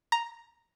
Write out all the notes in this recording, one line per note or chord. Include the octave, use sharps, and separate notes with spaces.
A#5